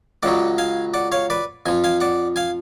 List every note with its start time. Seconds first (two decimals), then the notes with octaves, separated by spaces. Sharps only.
0.23 C#2 C#3 F#3 D5 F#5
0.58 F5 G#5
0.94 D5 F#5
1.12 C#5 F5
1.30 B4 D5
1.66 F2 F3 G#5
1.84 F5 G#5
2.00 D5 F#5
2.36 F5 G#5